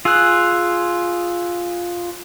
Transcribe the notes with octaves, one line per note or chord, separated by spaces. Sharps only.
F4 G#4 E6 F#6